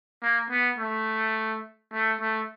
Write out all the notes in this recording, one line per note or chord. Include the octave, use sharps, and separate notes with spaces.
A#3
B3
A3
A3
A3